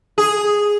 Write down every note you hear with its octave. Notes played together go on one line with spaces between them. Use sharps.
G#4